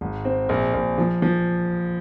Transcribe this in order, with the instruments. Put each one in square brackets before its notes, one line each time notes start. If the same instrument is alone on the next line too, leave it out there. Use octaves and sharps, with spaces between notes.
[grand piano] G#1
C4
A#1
A#1
F3
F3